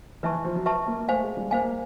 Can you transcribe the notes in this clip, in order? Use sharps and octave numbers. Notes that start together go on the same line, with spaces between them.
E3 B4 E5 A5 C#6
F3
F#3
B4 E5 A5 C#6
A#3
A3 C5 F5 G#5
G#3
G3
A#3 C5 F5 G#5